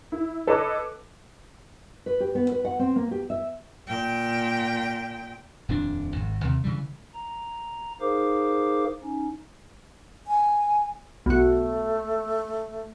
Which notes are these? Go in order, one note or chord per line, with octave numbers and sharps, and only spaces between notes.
E4
A4 B4 C#5 D#5 D6 F#6
B4
G4
B3
B4
F#5
C4
A#3
G4
E5
A#2 G5
D#1 F2 D4
G#1
D#2 C3
C#3 E3 G3
A#5
D#4 G#4 A#4 C5 F5 D6
C#4 D#4
G#5
B1 A3 F#4